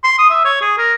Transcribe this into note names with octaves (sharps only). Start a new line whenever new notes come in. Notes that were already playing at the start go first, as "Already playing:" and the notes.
C6
D#6
E5
C#5
G#4
A#4